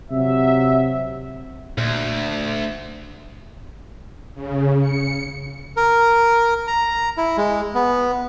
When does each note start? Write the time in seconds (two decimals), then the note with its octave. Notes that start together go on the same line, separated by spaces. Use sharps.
0.11 C3 F#3 E5
1.78 D2 A#2
4.35 C#3
4.81 C#7
5.77 A#4
6.68 A#5
7.17 E4
7.37 G#3
7.75 B3